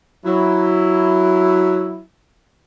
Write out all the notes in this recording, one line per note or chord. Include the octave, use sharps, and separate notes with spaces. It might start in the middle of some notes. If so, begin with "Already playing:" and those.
F#3 E4